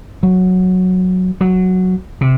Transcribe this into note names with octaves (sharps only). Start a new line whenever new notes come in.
F#3
F#3
C3